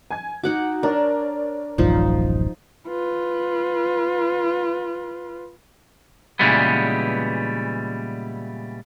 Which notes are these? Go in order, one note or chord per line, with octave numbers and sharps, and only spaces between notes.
G#5 G#6
D#4 F#4 F#5 D6
D4 A#4 C#5 D5
D1 A1 F#2 F3 D#4
F4 B4
A#2 C#3 E3 G3 G#3 B3